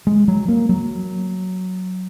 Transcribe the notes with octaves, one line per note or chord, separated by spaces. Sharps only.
G#3
F#3
A#3
F#3